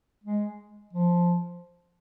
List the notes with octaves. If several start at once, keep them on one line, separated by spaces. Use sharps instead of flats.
G#3
F3